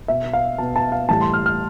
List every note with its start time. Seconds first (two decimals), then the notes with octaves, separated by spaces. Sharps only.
0.08 B2 B3 E5
0.33 F5
0.58 B2 B3 A5
0.76 A5
0.92 F5
1.09 A2 E3 G3 A5
1.21 C6
1.33 F6
1.46 F6